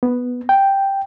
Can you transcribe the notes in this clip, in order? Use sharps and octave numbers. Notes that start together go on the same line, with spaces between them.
B3
G5